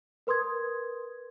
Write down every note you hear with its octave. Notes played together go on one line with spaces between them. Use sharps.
A#4 B4 C6 D#6 G#6